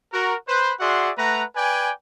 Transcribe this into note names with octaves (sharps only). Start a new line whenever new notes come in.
F#4 A#4
B4 C5
F#4 G#4 D5 E5 F#5 C6
A3 B4 F#5 A#5
B4 D5 G5 G#5